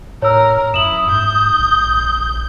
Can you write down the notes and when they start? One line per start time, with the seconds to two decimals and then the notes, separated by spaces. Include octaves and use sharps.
0.22 A2 A#4 C#5 E6
0.74 F#2 E4 D#6 E7 F#7
1.11 G#2 G6
1.59 A#1